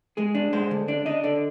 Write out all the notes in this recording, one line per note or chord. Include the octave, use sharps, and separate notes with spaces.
G#3 G#4
D4
G#3 C5
D3
D4 D5
D4 D#5
D3 D5